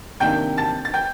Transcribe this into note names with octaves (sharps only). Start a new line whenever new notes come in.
C3 D#3 A#3 D4 G5 G6
A5 A6
A6
G5 G6